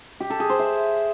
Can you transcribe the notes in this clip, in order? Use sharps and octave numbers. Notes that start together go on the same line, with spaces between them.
G4
A4
G#4
C5
E5